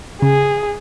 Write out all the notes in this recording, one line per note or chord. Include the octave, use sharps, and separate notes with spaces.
C#3 G#4